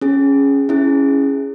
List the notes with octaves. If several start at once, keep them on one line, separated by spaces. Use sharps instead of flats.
C#4 G#4
C#4 E4 G#4